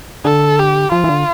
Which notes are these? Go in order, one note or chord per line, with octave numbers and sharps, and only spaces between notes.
D3 A4
G4
F3 F4
E3
D3